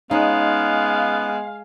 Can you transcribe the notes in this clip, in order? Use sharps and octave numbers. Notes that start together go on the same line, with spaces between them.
G#3 B3 C#4 D#4 F5